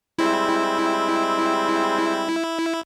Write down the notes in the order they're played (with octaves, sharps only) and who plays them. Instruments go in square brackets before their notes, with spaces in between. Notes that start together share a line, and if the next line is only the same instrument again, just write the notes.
[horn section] G3 G#3 C4 [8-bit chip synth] E4